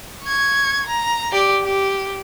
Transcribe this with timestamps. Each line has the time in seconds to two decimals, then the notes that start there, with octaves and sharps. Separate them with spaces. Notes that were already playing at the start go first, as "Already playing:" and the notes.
0.23 C#6 G#6
0.86 A#5
1.32 G4 D5
1.64 G4